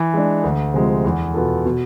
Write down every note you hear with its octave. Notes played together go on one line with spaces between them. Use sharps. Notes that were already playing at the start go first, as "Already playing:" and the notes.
Already playing: E3
G#3 D4
D2
C3 F3 G#3
E2
B2 B3 F4 A4
B2